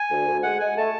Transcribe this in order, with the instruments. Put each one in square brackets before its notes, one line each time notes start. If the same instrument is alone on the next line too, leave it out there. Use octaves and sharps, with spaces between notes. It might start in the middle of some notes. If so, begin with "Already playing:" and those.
Already playing: [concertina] G#5
[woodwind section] D2
D2
[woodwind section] G#3 [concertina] F#5
[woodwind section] G#3 [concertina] G#5
[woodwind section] A3 [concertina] A5